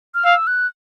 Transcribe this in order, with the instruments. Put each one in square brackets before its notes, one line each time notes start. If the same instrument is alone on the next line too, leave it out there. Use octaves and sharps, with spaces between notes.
[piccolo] F6
[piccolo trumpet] F5 [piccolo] E6
[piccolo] F#6